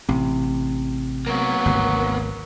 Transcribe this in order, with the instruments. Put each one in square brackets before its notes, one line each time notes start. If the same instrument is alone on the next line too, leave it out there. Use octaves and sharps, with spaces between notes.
[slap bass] A1 [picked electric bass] C3
[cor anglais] F#3 [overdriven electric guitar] A#3 B3
[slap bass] G#1 D2 C3